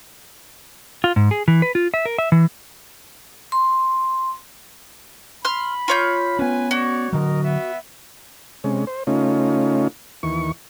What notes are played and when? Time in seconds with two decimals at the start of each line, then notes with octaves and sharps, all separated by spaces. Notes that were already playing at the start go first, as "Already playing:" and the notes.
1.04 F4
1.16 G#2
1.31 G#4
1.48 E3
1.62 B4
1.75 F4
1.94 E5
2.06 A#4
2.19 E5
2.32 E3
3.52 C6
5.45 B5 C6 F6
5.88 F4 C#5 G6
6.39 B3 C#4 B4 G#5
6.71 F#4 C#5 D5
7.13 D3 F#3 A#4 D#5
7.43 B3 E5
8.64 C3 G#3 C#4
8.87 C5
9.07 C#3 A3 C#4 D#4 F4
10.23 D#2 E3 C#6